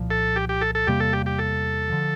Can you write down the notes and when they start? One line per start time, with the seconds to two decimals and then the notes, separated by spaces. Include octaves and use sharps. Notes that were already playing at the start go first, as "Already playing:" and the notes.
Already playing: C2 A#2 F3
0.10 A4
0.36 G4
0.49 G4
0.61 A4
0.75 A4
0.87 E2 C3 G3 A#3 G4
1.00 A4
1.13 G4
1.26 G4
1.39 A4
1.90 D3 F3